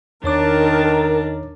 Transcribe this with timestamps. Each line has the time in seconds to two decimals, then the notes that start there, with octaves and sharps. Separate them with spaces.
0.24 E2 D#3 D4 A#4 C#5 A5 D6